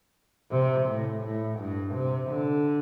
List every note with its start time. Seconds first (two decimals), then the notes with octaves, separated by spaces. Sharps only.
0.51 C3
0.88 A2
1.24 A2
1.59 G2
1.94 C3
2.30 D3